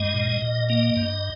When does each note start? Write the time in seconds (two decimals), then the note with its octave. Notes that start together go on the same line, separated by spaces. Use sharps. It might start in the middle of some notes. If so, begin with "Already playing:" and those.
Already playing: G2 G#3 D#5
0.14 A#2
0.42 A#2
0.69 A#3 D#5
0.96 G2